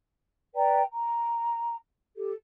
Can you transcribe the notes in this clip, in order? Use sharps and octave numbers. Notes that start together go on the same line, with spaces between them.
B4 D5 G5 A#5
A#5
G4 A4